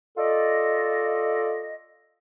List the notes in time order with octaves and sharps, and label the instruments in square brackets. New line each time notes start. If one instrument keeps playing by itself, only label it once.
[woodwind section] F4 A4 D5 D#5